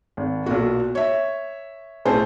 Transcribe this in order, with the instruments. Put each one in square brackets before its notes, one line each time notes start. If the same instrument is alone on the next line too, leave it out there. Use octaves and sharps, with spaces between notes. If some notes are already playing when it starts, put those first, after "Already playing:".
[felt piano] G#1
B1 A#2 F#4
C#5 E5
B1 A2 C#4 G#4 C5 A5